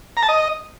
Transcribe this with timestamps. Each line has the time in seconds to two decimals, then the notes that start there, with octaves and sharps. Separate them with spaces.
0.17 A#5
0.23 A5
0.29 D#5